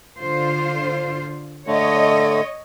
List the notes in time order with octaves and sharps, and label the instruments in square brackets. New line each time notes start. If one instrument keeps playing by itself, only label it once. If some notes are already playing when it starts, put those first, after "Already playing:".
[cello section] D3 F4 C5
[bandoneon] D3 A3 [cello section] C#5 D#5